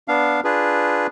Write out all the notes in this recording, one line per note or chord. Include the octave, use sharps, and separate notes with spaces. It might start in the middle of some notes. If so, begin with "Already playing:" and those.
B3 D4 F5
D4 F4 G#4 B4